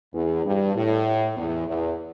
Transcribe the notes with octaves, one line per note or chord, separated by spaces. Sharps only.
E2
G2
A2
E2
E2